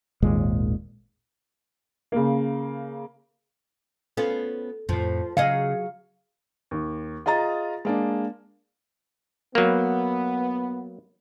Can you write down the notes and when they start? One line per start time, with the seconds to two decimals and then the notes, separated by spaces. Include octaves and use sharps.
0.22 G#1 D#2 A#2 G#3
2.12 C#3 A#3
4.17 B3 C#4 F4 A4
4.89 F2 A2 F3
5.37 C#3 F#3 G#4 D#5 F5 C#7
6.71 D#2
7.26 F4 G#4 D#5 A#5 A6
7.85 G#3 A#3 D4
9.55 F#3 A#3 B3